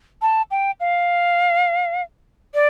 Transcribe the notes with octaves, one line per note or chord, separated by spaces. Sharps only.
A5
G5
F5
D5